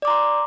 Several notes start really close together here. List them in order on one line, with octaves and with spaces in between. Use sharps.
D5 D6 A#5 C6